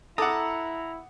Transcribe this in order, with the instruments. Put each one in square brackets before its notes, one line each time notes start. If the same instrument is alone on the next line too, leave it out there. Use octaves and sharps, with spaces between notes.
[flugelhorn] E4 [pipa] A4 [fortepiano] F#5 D6 D#6 [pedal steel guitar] A#5